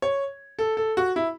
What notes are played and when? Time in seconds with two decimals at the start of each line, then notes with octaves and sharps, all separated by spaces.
0.02 C#5
0.59 A4
0.77 A4
0.97 F#4
1.16 E4